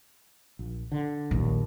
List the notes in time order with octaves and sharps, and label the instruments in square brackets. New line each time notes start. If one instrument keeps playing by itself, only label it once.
[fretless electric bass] A#1
D3
[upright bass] A#1 [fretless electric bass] D#2